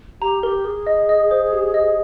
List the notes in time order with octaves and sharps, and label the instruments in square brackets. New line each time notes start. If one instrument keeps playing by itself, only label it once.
[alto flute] G4 [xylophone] A#5
[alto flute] G4 [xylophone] A#4
[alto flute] G#4 [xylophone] A#4
[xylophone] D#5
D#5
C5
G4
D#5